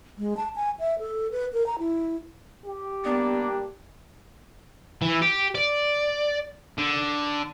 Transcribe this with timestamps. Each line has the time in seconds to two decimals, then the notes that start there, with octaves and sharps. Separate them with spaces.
0.18 G#3
0.37 A5
0.56 G#5
0.79 E5
0.99 A4
1.31 B4
1.53 A#4
1.66 A#5
1.79 E4
2.66 G4
3.05 G2 A#3 B3 D4
5.02 E3
5.22 G4
5.55 D5
6.78 D3